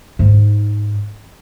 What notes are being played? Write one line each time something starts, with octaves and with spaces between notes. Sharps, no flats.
G#2 D#4